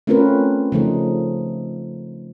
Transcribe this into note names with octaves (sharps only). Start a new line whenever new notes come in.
A3 C4 C#4 F4 A#4 B4
C#3 F3 A3 D#4